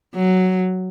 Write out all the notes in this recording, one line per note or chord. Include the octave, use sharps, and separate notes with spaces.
F#3